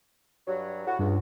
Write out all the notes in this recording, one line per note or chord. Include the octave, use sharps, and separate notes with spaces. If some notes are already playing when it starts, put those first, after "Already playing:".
G2 F#3
A2 F#4
C#2 G2